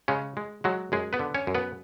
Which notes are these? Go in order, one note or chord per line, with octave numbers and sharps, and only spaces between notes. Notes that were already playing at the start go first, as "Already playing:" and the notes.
C#3 G#3 C#4
G#3
F#3 G#3 F#4
F#2 G#3 G#4
B3 B4
D3
C#4 C#5
F#2
B3 B4